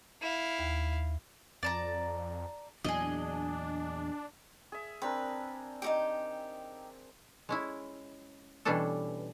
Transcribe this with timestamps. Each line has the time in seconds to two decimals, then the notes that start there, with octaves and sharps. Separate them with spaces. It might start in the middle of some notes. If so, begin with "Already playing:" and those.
0.22 E4 F5
0.59 D#2
1.63 F2 D5 A5 A#5
2.84 E2 A#2 F#3 D4 G#4 D#5
4.72 G#4 E5
5.02 C4 D4 A#4 B4
5.82 D#4 F#4 G4
7.49 G#3 C#4 E4
8.65 B2 E3 G3 C#4 D4 A4